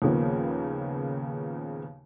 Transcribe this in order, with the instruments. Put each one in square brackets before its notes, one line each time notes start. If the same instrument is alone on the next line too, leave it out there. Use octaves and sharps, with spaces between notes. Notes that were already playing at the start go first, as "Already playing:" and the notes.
[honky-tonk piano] D#2 A#2 C#3 F3 A#3 B3